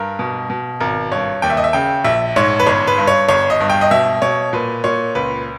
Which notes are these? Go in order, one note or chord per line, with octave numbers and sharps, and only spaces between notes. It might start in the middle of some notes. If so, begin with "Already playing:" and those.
Already playing: G2 A#4
B2
B2
G#1 A#4
G2 C#5
D#2 G5
E5
D#5
E5
C#3 G5
A#1 E5
G#2 C#5
B4
G1 C#5
B4
G2
C#5
G1 C#5
D#5
G2
G5
D#5
B2 E5
B2 C#5
A#2 B4
A#2 C#5
C#2 B4